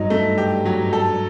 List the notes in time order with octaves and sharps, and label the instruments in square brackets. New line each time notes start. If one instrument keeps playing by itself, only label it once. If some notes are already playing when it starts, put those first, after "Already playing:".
Already playing: [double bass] G2 [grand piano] F#3 D#4
[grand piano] A3
G4
F#3
A4